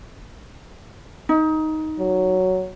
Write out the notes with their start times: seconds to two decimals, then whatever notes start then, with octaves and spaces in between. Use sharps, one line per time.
1.29 D#4
1.99 F#3